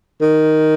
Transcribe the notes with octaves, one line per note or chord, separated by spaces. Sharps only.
D#3